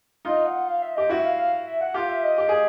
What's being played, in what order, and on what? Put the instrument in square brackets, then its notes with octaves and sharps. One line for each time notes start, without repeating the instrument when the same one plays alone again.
[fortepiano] D#4 F4 [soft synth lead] D#5
[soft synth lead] F#5
F5
E5
[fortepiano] G4 [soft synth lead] D#5
[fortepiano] E4 F#4 [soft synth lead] E5
[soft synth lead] F5
F5
E5
F#5
[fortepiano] F4 G4 [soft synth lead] F5
[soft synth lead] E5
D#5
[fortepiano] G4
G#4